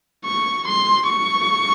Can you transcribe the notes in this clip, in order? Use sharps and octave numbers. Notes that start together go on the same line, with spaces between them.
C#6
C6
C#6